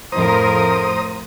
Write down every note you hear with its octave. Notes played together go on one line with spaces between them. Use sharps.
F2 A2 A#4 C5 A#5 D#6